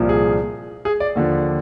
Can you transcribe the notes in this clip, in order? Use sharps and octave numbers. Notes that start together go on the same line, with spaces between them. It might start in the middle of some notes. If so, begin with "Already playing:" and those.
Already playing: C2 A#2 F3
G#4
G#4
D5
D#2 D3 F3